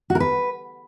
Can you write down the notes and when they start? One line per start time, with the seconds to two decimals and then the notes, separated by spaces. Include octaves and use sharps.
0.10 F#4
0.15 A#4
0.20 B4